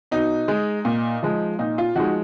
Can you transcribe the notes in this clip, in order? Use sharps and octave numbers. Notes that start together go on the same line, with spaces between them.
B2 D#4
G#3
A#2
F3 G#3
A#2 D#4
F4
F3 G#3 D#4 F#4